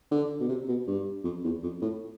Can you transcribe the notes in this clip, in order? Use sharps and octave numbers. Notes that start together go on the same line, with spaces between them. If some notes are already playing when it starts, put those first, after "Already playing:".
D3
B2
C3
B2
G2
F2
E2
F2
A2